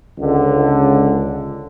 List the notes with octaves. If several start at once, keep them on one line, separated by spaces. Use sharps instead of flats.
C#2 D3